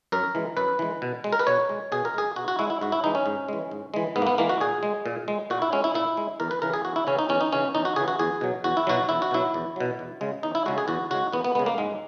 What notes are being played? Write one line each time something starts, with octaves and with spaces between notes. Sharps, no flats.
F#2 A#4
E3 G#3
F#2 B4
E3 G#3
B2
G#3
A#4
B4
B2 C#5
G#3
B2 G#4
A#4
G#3 G#4
B2 F#4
F#4
G#3 E4
E4
G#2 F#4
E4
E3 G#3 D#4
C#4
G#2
E3 G#3
G#2
E3 G#3
G#2 B3
A#3
B3
E3 G#3 A#3
F#4
A#2 G#4
G#3
A#2
G#3
A#2 F#4
E4
G#3 C#4
E4
A#2 E4
G#3
E2 A#4
B4
C#3 E3 A#4
G#4
E2 F#4
E4
C#3 E3 C#4
D#4
E2 C#4
D#4
C#3 E3 C#4
E2 D#4
F#4
C#3 E3 G#4
F#4
E2 G#4
B2 F#3
E2 F#4
E4
B2 F#3 F#4
E2 E4
F#4
B2 F#3 E4
E2
B2 F#3
E2
C#3 G#3
E2 D#4
E4
C#3 G#3 F#4
G#4
E2 F#4
C#3 G#3 F#4
E2 B3
B3
C#3 G#3 B3
A#3
G#2 G#3